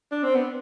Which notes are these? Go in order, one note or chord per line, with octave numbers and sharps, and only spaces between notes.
D4
C4
B3